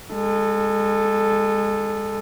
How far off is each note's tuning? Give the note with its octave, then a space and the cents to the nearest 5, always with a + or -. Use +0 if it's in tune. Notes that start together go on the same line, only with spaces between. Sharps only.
G#3 -30 A4 +0